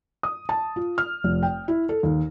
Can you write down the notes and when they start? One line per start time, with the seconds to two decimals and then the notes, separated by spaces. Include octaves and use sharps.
0.23 D#6
0.49 A5
0.76 F4
0.98 F6
1.24 F1
1.43 G5
1.68 E4
1.89 A4
2.03 D#2